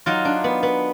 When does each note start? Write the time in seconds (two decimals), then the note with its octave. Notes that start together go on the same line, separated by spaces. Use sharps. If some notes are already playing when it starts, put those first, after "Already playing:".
0.06 F#3 D#4 F4
0.25 D4
0.44 B3
0.63 B3